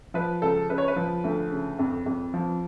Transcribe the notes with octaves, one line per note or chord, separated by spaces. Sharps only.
F3 B4
C#2 A4
C#3 B4
C#5
B4
F3
D2
C#3
F2
F2
F3